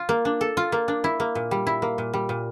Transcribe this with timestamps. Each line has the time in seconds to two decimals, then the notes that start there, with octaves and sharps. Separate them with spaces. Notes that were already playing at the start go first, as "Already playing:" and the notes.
Already playing: F4
0.09 A#3
0.25 D4
0.41 A4
0.57 F4
0.72 A#3
0.88 D4
1.04 E4
1.20 A#3
1.35 A#2
1.51 G3
1.67 E4
1.82 A#3
1.98 A#2
2.13 G3
2.29 A#2